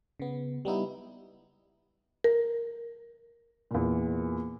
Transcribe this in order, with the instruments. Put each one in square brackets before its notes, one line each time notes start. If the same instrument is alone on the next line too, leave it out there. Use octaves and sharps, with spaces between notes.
[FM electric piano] C#3 B3
G3 B3 D#4 E4
[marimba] A#4
[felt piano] E2 A#2